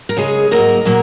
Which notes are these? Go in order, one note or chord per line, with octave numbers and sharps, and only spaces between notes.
A#4
C#3 G#3 G#4 C#5
G#2 F#3 A#3 A#4 D#5
A#2 F#3 A#3